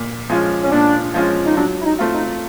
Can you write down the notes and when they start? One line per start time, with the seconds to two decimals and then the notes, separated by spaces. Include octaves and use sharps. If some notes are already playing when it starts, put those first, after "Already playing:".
Already playing: A#2
0.30 F3 G#3 C#4 F4
0.63 C#4
0.72 A#2 D4
1.14 F3 G#3 C#4 F4
1.46 D#4
1.57 F#3 D4
1.81 E4
1.85 D#4
1.99 A3 C4 F4
2.14 D#4